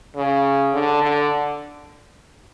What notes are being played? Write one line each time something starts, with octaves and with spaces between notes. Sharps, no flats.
C#3
D3
D3